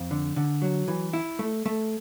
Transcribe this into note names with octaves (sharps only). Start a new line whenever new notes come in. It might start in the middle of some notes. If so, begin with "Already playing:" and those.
Already playing: F2
D3
D3
F#3
E3
E4
A3
A3